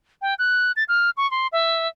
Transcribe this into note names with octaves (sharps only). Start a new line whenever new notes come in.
G5
F#6
A6
F6
C#6
C6
E5